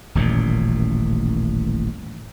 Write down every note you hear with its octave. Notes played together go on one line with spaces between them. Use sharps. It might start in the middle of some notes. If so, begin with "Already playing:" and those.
D#1 A1 F#2 A#2